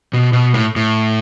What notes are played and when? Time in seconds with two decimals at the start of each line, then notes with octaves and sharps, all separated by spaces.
0.13 B2
0.33 B2
0.54 A2
0.76 A2